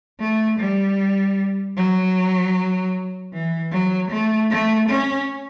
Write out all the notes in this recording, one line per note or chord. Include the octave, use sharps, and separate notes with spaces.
A3
G3
F#3
E3
F#3
A3
A3
C#4